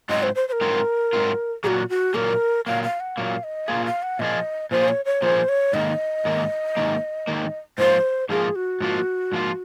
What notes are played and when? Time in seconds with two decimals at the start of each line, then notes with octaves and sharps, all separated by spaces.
0.09 G#2 F#3 C4 F4 D#5
0.23 C5
0.35 C5
0.48 C5
0.52 A#4
0.61 G#2 F#3 C4 F4
1.13 G#2 F#3 C4 F4
1.64 A#2 F#3 A#3 F#4 G#4
1.89 F#4
2.14 A#2 F#3 A#3 A#4
2.66 A#2 F#3 A#3 F5
2.83 F5
3.00 F#5
3.17 A#2 F#3 A#3 F5
3.44 D#5
3.68 A#2 F3 A#3 F4 G#4 F5
3.86 F5
4.03 F#5
4.19 A#2 F3 A#3 F4 G#4 D#5
4.71 A#2 F3 A#3 F4 G#4 C5
4.88 C#5
5.05 C#5
5.22 A#2 F3 A#3 F4 G#4 C5
5.49 C#5
5.73 G#2 D#3 A#3 D#5
6.25 G#2 D#3 A#3
6.77 G#2 D#3 A#3
7.27 G#2 D#3 A#3
7.78 G#2 F3 A#3 F4 C5
8.29 G#2 F3 A#3 F4 G#4
8.56 F#4
8.80 G#2 F3 A#3 F4
9.32 G#2 F3 A#3 F4